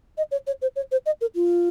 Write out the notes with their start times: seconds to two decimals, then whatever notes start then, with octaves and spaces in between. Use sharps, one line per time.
0.17 D#5
0.31 C#5
0.47 C#5
0.62 C5
0.76 C#5
0.91 C5
1.06 D#5
1.21 A#4
1.35 F4